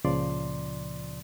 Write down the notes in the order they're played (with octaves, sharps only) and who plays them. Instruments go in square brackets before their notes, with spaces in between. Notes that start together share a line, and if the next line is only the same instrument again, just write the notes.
[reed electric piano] C#2 A#2 C#3 F3 D5 C6